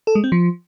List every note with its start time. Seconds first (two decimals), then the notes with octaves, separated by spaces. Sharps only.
0.07 A4
0.15 G#3
0.24 C4
0.32 F3